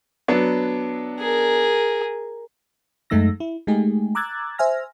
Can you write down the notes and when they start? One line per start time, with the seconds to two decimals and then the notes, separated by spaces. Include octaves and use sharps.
0.28 F#3 B3 D4
1.20 G#4 A#4
3.10 F#2 G#3 A3 D#4 E6 A#6
3.40 E4
3.67 G#3 A3 D#4 G4 G#4
4.15 A#5 D6 E6 F#6 G#6 A6
4.58 C5 E5 G#5 F6 A#6